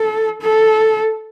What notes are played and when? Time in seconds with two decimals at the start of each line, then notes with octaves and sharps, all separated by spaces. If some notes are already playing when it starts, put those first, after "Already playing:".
Already playing: A4
0.42 A4